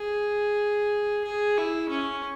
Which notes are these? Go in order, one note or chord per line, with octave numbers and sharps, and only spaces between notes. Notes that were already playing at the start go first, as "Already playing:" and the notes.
Already playing: G#4
G#4
E4
C#4